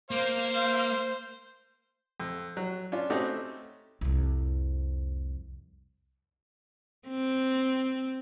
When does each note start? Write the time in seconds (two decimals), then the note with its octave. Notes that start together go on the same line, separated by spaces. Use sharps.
0.11 A#3 C5 F5
2.20 F2
2.57 F#3
2.92 C#4 D4 F4
3.10 A3 C4 C#4 D#4 F#4 G4
4.01 C2 F2
7.08 C4